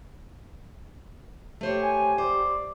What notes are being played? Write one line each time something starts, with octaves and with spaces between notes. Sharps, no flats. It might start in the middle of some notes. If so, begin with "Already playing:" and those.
A3 G4 C5 C#5
G#5
C5 D5